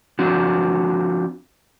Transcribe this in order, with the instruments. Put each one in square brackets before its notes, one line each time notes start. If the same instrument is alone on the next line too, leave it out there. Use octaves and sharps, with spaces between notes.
[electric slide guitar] F3 C4 D4 F#4